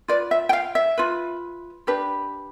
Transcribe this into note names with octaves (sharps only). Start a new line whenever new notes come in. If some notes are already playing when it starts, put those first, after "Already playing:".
F4 B4 D5
E5
G5
F5
E5
F4 B4
D4 G4 B4